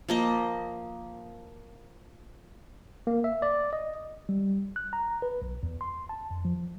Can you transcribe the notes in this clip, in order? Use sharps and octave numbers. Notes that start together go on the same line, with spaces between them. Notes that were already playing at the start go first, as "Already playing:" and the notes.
F3 A#3 D#5
A#3
E5
D5
D#5
G3
F#6
A#5
B4
B1
E2
C6
A5
F2
F3